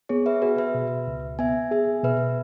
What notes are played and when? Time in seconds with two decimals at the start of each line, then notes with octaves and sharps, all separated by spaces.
0.09 B3 G#4 C#5
0.26 B4 E5
0.42 F#4 G#4 B4
0.58 B4 E5
0.74 B2
1.07 C#2
1.39 B3 E5 G#5
1.71 G#4 E5 G#5
2.04 B2 B4 E5